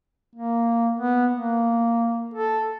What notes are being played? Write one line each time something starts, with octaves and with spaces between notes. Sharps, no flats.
A#3
B3
A#3
A4